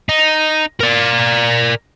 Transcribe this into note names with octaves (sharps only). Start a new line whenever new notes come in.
D#4
A#4 D5